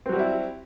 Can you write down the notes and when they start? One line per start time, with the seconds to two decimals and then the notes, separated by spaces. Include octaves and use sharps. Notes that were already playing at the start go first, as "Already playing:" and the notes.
0.06 C4
0.09 F#3
0.12 F#4
0.16 G3
0.19 E4